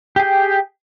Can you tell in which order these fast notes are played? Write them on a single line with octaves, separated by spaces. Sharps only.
G4 G#4 G5